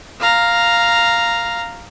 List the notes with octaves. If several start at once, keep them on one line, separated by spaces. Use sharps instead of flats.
F5 A#5